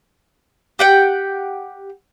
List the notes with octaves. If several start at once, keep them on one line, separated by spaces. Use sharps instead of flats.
G4 F#5 G5